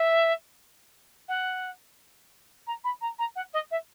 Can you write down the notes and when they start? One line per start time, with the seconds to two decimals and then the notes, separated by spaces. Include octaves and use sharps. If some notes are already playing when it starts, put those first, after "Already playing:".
Already playing: E5
1.28 F#5
2.67 A#5
2.84 B5
3.01 A#5
3.18 A#5
3.35 F#5
3.53 D#5
3.71 E5